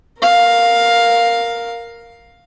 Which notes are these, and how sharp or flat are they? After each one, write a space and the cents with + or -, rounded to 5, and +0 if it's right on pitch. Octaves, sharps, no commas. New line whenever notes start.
A#4 +0 F5 +10